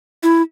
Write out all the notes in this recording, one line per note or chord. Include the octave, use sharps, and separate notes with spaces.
E4